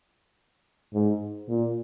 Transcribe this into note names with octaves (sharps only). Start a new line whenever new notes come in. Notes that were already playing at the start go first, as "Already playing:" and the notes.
G#2
A#2